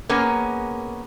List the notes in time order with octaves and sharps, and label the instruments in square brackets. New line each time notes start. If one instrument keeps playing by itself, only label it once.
[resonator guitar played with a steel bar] A#3 B3 C#4 G#4 A#4